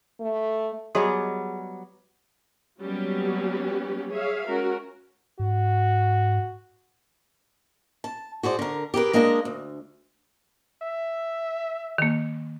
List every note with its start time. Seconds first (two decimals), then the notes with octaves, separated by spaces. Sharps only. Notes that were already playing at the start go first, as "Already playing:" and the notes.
0.21 A3
0.95 F#3 G3 B3 F#4 G#4 C#5 D#5
2.80 F#3 G3 A#3 B3 C#4 G4
4.11 G#4 C#5 E5 F5
4.47 G#3 C#4 F#4 A#4
5.39 G#2 F#4
8.04 A5
8.43 F#4 G#4 C5 D5
8.59 D3 A#4
8.94 G4 G#4 A#4 B4
9.13 G#3 A#3 D4 A4 C5 D#5
9.45 D2
10.83 E5
11.98 D#3 A#3